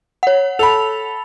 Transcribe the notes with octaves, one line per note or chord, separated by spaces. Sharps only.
C#5 F#5
A4 B5 F7